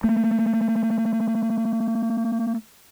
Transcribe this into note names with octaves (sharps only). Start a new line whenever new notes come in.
A3 A#3